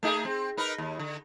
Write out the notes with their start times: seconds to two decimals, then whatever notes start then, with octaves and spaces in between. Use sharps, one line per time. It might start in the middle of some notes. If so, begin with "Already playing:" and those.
0.03 A3 D#4 G#4
0.25 C4
0.57 D#4 A#4 B4
0.78 D#2
0.99 D3